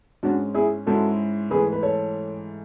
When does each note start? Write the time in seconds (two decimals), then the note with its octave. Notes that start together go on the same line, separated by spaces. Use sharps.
0.23 G#2 G#3 C#4 D4 F#4
0.54 E4 G#4
0.86 G#2 G#3 C#4 E4 F#4 A4
1.50 G#2 E3 A3 G#4 B4
1.72 B4
1.83 A4 C#5